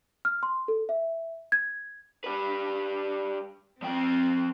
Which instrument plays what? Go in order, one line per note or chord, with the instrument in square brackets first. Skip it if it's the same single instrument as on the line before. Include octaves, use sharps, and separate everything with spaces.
[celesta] F6
C6
A4
E5
G#6
[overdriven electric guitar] G3 B4
[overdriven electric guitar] F3 G5 [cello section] C4